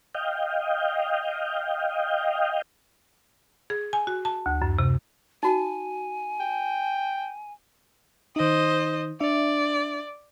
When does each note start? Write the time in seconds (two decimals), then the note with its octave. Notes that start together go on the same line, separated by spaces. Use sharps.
0.15 D#5 F5 G5
3.70 G#4
3.93 G#5
4.07 F#4
4.25 A5
4.46 D2
4.62 F#2
4.79 C3
5.43 D#4 F#4 G#5
6.40 G5
8.36 D#3 D#4 C5 D#5
9.20 D4 D5 E5